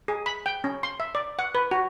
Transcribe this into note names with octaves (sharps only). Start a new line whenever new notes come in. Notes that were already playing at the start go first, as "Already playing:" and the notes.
G#4
B5
G5
C#4
C6
E5
D5
F#5
B4
F#4